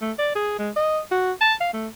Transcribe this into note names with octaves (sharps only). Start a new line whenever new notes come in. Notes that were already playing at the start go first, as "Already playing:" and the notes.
A3
D5
G#4
G#3
D#5
F#4
A5
F5
A3